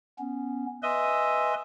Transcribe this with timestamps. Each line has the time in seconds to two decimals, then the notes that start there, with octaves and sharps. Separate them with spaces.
0.19 B3 C#4
0.83 B4 D#5 E5 G#5 C6